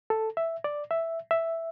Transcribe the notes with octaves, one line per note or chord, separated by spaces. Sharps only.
A4
E5
D5
E5
E5